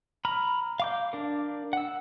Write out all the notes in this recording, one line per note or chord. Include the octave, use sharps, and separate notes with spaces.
A#5 B5 F6
F5 D6 G6
D4 A#4
F#5 E6